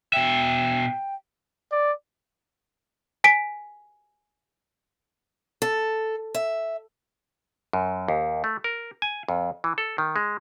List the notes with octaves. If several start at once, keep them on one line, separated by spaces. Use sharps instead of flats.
B2 E5 G5
D5
G#5 B6 D7
A4
E5
F#2
D#2
A3
A#4
G#5
F2
E3
A4
D#3
G#3